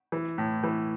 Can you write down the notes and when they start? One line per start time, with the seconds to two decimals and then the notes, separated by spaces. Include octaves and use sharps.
0.12 E3
0.38 A2
0.63 E3